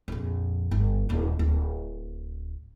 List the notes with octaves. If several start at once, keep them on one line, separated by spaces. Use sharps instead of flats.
A#1 F2
G1
D#1 D#2
D1